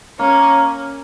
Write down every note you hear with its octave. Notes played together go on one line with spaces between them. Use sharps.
A#3 C#4